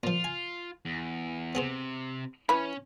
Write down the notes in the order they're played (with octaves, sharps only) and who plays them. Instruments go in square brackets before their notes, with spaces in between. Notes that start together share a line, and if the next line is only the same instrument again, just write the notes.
[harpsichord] A#2 F3 [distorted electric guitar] F4
[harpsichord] G#5
[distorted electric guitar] E2
[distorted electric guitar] C3 [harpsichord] B3 G#4 C5
[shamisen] E3 B5 [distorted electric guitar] C#4 G#5